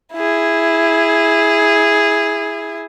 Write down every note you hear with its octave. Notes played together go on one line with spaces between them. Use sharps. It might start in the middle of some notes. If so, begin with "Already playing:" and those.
E4 G#4